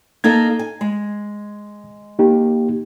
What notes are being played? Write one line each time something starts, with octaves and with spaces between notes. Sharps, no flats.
A#3 D#4 A4 G#6
G#5
G#3
A#3 D#4 G4